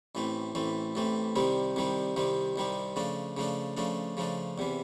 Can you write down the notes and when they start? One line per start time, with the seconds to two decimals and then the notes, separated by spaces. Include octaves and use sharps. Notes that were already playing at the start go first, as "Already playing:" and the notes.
0.15 A1 A2 E3 A3 C4
0.55 A1 A2 E3 A3 C4
0.95 A1 A2 E3 A3 C4
1.36 C2 C3 D#3 G3 C4
1.76 C2 C3 D#3 G3 C4
2.16 C2 C3 D#3 G3 C4
2.56 C2 C3 D#3 G3 C4
2.96 C#3 F3 A3 D4
3.37 C#3 F3 A3 D4
3.77 C#3 F3 A3 D4
4.17 C#3 F3 A3 D4
4.58 E2 C3 E3